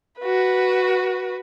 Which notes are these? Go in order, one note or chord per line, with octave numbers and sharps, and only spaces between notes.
F#4 B4